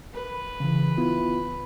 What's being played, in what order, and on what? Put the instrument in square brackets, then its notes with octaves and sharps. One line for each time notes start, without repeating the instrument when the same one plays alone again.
[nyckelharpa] B4
[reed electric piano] C#3 E3
B3 E4 F4